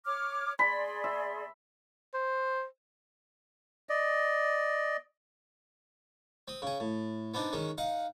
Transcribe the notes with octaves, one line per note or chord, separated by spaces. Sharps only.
C#5 D6 F6
G#4 D5 B5 C6
E5
C5
D5 D#5
C4 D#6
C#3 G#4
A2
B3 C4 D4 D#4
D#3 G#3 C#4
D#4 F5 F#5